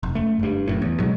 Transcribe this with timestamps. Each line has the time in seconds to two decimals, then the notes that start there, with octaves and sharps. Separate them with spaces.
0.03 F1
0.15 F#2 A3
0.39 F#1 G2
0.68 F1 F#2 A2
0.82 E2
0.99 F#2 B2 F#3 G#3